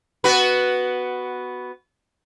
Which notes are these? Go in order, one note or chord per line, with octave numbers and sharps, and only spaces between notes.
B3 F#4 B4